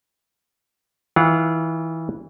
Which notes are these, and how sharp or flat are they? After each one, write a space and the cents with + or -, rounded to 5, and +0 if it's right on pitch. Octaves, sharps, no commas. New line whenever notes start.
E3 -20 F4 -30 F#5 -30